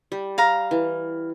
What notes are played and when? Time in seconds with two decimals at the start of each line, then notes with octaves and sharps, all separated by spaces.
0.12 G3
0.38 F5 A#5
0.71 E3